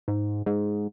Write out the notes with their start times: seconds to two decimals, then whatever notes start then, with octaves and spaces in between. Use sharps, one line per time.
0.08 G#2
0.46 G#2